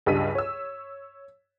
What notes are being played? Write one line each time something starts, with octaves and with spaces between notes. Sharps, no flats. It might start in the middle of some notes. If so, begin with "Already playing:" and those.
C#2 G2 G3 E6 B6 D#7
C#5 E6